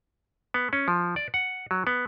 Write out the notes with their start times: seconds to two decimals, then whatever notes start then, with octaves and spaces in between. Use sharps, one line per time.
0.54 B3
0.73 C#4
0.88 F3
1.16 D5
1.34 F#5
1.71 F#3
1.87 B3